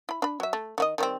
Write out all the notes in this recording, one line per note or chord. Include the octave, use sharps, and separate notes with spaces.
E4 B5
D4 B5
F#3 E5
A3
D#3 F#4 D#5
D#3 G3 C4